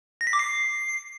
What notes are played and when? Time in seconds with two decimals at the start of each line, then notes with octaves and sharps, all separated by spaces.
0.21 A#6
0.27 B6
0.33 D6
0.39 C7